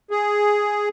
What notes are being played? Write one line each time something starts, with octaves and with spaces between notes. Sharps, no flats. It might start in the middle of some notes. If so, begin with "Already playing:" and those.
G#4